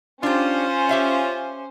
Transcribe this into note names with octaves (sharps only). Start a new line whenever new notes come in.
C#4 D4 F4 G4 C5
G4 E5 F5